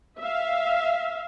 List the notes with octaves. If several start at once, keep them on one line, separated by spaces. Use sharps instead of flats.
E5 F5